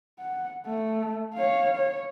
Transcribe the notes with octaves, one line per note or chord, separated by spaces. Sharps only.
F#5
A3
C#5 F5
C#5